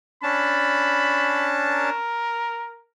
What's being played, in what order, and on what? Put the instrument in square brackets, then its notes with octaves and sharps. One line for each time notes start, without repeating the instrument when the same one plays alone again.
[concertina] C#4 D4 A5 [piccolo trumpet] B5
[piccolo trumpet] A#4